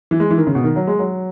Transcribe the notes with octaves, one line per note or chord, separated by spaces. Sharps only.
E3
G#3
E3
D#3
C#3
B2
D#3
F#3
G#3
F#3